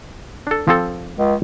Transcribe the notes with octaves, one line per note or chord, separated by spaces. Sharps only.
D4 A4
F3 C4 A4
C#2